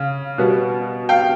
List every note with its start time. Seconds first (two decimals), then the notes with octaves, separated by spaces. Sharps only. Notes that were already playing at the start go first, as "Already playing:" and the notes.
Already playing: C#3 F5
0.38 B2 G3 B3
1.09 F5 G5